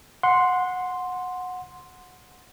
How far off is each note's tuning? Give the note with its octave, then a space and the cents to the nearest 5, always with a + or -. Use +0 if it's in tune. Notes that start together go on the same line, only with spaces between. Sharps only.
F#5 -20 C6 +0